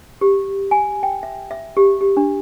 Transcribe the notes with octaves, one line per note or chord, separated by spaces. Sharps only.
G4
G#5
G5
E5
E5
G4
G4
D4